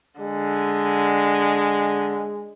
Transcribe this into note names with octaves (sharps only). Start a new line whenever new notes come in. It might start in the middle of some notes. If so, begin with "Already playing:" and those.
D3 G#3